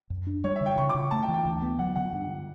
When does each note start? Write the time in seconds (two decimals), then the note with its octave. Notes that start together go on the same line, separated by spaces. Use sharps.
0.10 F#2
0.27 D4
0.44 G3 C#5
0.56 E5
0.61 D3
0.66 G5
0.78 C#3 C#6
0.89 D6
0.95 C#3
1.11 A3 A5
1.23 G5
1.28 E3
1.34 G5
1.45 D2
1.62 B3
1.79 F#3 F#5
1.96 D3 F#5
2.13 G2